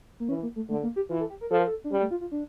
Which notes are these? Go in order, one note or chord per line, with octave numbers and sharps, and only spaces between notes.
A#3
E3 C#4
A#3
A3
D3 A3
A#3
G4
E3 F4
A4
G4
A#4
F3 A4
A#4
A4
D4
G3 C#4
A3
F4
F4
D4